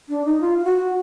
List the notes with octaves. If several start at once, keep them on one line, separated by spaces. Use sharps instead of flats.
D4
D#4
F4
F4
F#4